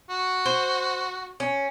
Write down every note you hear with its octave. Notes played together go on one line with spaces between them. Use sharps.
F#4
C5
C#4